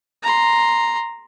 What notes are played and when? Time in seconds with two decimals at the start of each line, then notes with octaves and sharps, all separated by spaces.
0.23 A#5 C6